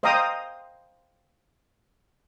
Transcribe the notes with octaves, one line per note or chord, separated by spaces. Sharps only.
C5 D#5 F5 G5 A#5 D#6